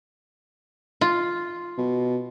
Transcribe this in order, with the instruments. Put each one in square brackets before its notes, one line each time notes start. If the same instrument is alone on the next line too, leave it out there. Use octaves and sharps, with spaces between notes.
[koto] F4
[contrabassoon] B2